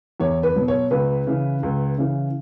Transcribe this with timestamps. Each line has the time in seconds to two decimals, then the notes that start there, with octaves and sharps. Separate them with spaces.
0.20 E2 C#5
0.43 B4
0.56 B2 F#3
0.68 C#5
0.91 C#2 B4
1.27 C#3 E3
1.63 C#2
1.98 C#3 E3